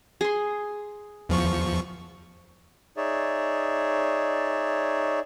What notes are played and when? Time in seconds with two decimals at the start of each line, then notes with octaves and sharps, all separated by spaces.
0.21 G#4 C6
1.29 E2 F3 C#6
2.97 D#4 G#4 C#5 D5 E5